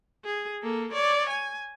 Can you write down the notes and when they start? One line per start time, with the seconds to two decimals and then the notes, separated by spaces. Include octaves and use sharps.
0.25 G#4
0.62 A#3 A4
0.92 C#5 D5
1.30 G#5